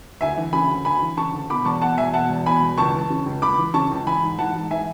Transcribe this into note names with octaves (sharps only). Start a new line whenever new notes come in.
D2 E5 G#5
E3
C#3 G#5 B5
D2
D2 G#5 B5
E3
C#3 A5 C#6
D2
B2 B5 D6
E2 A5 C#6
B2 F#5 A5
E2 E5 G#5
B2 F#5 A5
E2
B2 G#5 B5
E2
C#2 A5 C#6
E3
C#3
C#2
C#2 B5 D6
E3
C#3 A5 C#6
C#2
E3 G#5 B5
G#2
E3 F#5 A5
G#2
E3 E5 G#5